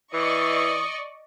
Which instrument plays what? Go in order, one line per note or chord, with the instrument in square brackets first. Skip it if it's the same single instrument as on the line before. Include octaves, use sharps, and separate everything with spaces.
[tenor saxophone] E3 [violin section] D5 D#5 C#6 [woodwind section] D#6